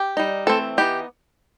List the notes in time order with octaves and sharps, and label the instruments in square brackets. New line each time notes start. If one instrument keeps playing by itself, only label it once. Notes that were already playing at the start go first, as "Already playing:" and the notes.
Already playing: [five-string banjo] G4
G3 D#4
E3 A3 C4 A4
E3 B3 D#4 G4